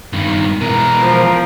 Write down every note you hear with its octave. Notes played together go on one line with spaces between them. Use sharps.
G2 D#3
B2 E3 A#4
F3